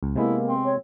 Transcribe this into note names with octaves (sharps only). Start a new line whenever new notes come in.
C#2
C3 G#3 A#3 B3 E4
C4
C#5